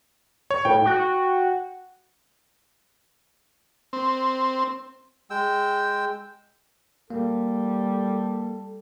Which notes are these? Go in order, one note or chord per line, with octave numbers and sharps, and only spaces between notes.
C#5
A2 G5
F#4
C4
G#3 G5 E6
G3 A#3 A4